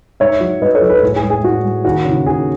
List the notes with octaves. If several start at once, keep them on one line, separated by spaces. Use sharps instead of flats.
G#2 C#5 E5
F#3
G#2 B4 D#5
A4 C#5
F#3
G#4 B4
A2
G#4
G#3
G#4
A2 F#4
G#3
D#2 F#4
C#3 E3
D#2 G#4